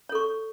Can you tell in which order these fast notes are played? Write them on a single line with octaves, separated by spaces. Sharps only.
C#5 A4 C#6